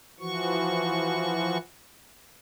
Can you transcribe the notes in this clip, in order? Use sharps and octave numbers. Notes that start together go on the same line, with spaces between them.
E3 F3 F#4 C#6